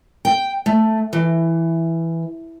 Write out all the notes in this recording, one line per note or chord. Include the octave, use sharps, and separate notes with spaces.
G5
A3
E3